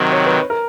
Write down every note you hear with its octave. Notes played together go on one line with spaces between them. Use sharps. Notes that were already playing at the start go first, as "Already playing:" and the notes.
Already playing: C3 D#3 F#3 C5
C#5
B4
A#4